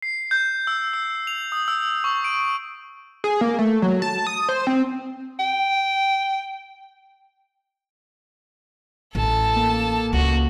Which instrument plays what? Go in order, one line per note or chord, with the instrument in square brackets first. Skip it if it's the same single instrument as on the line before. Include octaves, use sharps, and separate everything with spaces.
[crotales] C7
G6
E6
E6
F7
D#6
E6
C#6
D7
[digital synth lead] G#4
A#3
A3
F#3
A5
D#6
C5
C4
[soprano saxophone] G5
[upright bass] A1 [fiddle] A4 A5
[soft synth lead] A#3
[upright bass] C#2 C#3 [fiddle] F#4